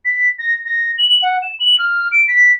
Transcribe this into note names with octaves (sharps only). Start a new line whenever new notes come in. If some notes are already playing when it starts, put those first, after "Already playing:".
B6
A#6
A#6
F#7
F#5
E7
F#7
F6
D7
B6